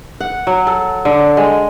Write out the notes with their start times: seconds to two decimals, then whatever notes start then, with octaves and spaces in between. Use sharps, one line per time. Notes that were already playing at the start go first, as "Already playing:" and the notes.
0.21 F#5
0.47 F#3
0.67 A4
1.05 D3
1.37 G#3